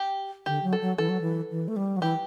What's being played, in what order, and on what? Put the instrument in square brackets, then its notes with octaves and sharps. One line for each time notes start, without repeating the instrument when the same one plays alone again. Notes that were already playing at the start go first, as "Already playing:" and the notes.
Already playing: [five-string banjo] G4
[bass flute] D3 [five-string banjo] G4
[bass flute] F#3
[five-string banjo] A4
[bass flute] F#3
[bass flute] E3 [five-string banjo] A4
[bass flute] F#3
E3
E3
A3
G3
F#3
[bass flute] E3 [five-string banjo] G4